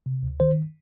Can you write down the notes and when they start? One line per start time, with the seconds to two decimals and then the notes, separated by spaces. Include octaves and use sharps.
0.06 C3
0.23 D2
0.40 D#3 C5